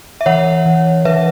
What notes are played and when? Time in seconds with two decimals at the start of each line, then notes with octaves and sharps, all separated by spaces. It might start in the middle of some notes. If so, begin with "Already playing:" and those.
0.21 E5
0.26 E3 C#5 F#5
0.66 E3
1.05 E3 B4 E5